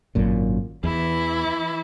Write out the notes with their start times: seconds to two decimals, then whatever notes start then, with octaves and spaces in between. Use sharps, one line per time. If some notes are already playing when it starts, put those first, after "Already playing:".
0.15 G#1 F#2 A#2
0.84 E2 E3 E4